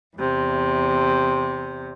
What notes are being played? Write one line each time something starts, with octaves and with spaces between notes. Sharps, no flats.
E2 C3